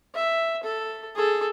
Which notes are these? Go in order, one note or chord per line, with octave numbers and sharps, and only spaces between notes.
E5
A4
G#4 A4